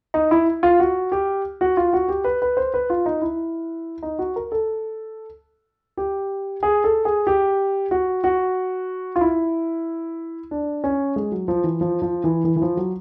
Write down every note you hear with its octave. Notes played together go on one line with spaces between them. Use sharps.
D#4
E4
F4
F#4
G4
F#4
F4
F#4
G4
B4
B4
C5
B4
F4
D#4
E4
D#4
F#4
A#4
A4
G4
G#4
A4
G#4
G4
F#4
F#4
F4
E4
D4
C#4
G#3
F#3
F3
E3
F3
F3
E3
E3
E3
F3
F#3